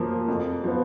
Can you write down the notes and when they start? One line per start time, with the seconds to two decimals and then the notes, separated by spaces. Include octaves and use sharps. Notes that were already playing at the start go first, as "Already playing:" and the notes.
Already playing: F#2 F3 A#3
0.28 F2
0.64 F3 B3